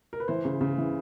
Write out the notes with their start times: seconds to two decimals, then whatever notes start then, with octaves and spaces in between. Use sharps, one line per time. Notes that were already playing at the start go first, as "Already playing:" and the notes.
0.13 A#4
0.20 B4
0.28 E3 C5
0.45 C#3
0.61 C#3
0.78 E3